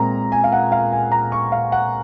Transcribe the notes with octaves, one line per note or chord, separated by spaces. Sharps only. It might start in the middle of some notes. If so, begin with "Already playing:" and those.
Already playing: A#2 G#3 C4 A#5
G#5
F5
F#5
F5
G#5
A#5
C#6
F5
F#5